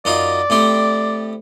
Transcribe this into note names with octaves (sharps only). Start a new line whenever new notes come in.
F#2 D#4 F4 D5
A2 C4 G4